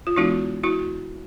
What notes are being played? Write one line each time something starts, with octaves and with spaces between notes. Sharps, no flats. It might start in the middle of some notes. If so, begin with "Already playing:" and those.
F4
E3 G#3 B3 D4 E4 F#4
E4 F#4